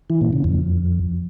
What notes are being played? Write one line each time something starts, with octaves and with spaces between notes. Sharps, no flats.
E3
A#2
C#3
F2